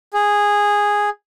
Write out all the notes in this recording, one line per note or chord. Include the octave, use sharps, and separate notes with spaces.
G#4